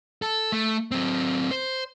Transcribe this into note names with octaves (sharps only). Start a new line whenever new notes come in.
A4
A3
F#3 C4
C5